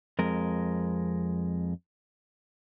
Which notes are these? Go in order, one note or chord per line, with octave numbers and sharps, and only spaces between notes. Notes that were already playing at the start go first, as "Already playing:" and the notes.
F2 G#3 A#4